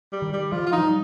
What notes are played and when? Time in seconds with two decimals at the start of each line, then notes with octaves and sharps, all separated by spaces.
0.12 G3
0.22 D#3
0.33 G3
0.52 F3 F4
0.66 F4
0.72 D#4
0.78 F3
0.83 G3